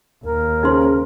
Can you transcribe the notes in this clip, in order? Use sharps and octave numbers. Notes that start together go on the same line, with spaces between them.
D#2 A#4
C#3 D#4 C5 C6